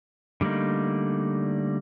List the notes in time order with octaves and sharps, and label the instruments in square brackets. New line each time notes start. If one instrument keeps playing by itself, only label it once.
[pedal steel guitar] D3 G3 A3 A#3 D#4